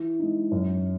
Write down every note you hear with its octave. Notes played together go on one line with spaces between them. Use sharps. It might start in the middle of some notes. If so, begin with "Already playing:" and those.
Already playing: E3
G#3 D#4
F#2